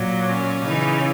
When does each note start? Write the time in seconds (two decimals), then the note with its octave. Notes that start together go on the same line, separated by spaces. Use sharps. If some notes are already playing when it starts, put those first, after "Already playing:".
Already playing: A#2 F#3
0.27 C#4
0.64 C#3 E3 D#4